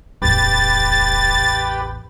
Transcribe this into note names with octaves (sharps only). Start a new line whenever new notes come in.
D1 A1 E2 G4 B4 A6